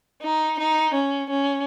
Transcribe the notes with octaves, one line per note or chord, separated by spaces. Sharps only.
D#4
D#4
C#4
C#4